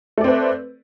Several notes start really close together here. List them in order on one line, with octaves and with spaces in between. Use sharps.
A3 D5 C4 B4